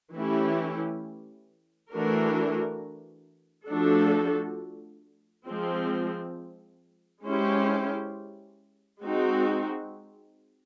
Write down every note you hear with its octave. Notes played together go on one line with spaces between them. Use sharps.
E3 A3 C#4 E4 G4
E3 A3 D4 F#4 A#4
F3 A3 D4 F#4 A4
F3 G#3 C4
G#3 C#4 E4 G4 C5
G#3 C4 D#4 F#4